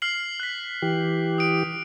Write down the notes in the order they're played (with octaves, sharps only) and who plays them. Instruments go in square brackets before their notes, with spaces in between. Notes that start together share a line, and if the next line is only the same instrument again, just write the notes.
[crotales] F6 C7 F#7
F#6 B6
[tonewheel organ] E3 G4
[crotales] D#6 D7